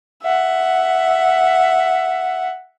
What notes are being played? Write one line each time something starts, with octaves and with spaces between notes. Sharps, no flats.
E5 F#5